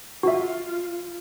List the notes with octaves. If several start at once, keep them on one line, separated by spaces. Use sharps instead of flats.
F4 F#4 E5